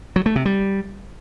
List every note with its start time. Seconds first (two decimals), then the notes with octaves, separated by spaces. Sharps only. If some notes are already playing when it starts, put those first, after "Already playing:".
0.16 F#3
0.26 A3
0.36 C3
0.46 G3